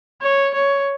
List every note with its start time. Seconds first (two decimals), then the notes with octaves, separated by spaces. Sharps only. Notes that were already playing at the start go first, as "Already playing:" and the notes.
0.22 C#5
0.54 C#5